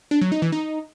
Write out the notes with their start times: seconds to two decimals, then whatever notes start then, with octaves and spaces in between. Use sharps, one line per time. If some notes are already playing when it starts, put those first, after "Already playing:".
0.11 D4
0.21 F#3
0.32 D#4
0.42 E3
0.52 D#4